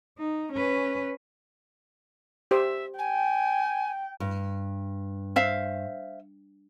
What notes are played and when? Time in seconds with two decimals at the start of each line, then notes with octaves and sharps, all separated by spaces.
0.18 D#4
0.53 C#4 B4
2.51 G4 C5 E5
2.99 G5 G#5
4.20 G2
5.36 C5 E5 F5